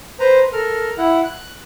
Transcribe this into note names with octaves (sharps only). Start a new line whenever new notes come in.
B4 C5 A#5
A4 A#4 F6
E4 F#5
F#6